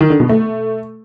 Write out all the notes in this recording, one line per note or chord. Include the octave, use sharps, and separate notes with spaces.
D#3
D3
B2
A3